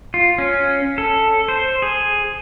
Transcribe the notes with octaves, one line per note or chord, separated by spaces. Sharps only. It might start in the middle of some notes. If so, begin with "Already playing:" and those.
F4
C#4
A4
C5
G#4